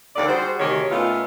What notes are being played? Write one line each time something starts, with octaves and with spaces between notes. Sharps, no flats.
D#2 D3 D5
G3 F#4 G#4 C5
D2 C3 D#3 G4 G#4 C#5
A#2 A3 B3 C#4 D#4 F4